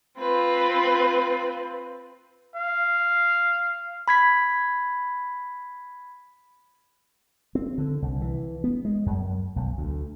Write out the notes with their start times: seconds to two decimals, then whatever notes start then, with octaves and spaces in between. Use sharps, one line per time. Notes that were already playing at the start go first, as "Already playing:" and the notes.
0.20 C4 F4 B4
2.56 F5
4.08 B5 G#6 B6
7.55 C4
7.78 D3
8.02 C2
8.21 E3
8.64 B3
8.85 G#3
9.06 F#2
9.56 B1
9.78 D2